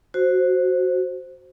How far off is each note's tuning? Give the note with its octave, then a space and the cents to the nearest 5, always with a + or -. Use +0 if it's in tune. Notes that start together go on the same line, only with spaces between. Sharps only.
F#4 +0 C5 +0